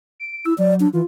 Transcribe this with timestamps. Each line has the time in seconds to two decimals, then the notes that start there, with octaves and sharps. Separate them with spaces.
0.20 D7
0.46 E4 E6
0.58 F#3 D5
0.80 D4
0.93 E3 F4